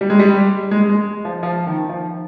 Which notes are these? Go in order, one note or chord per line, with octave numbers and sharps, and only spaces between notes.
G3
G#3
G3
G#3
G#3
F3
F3
D#3
F3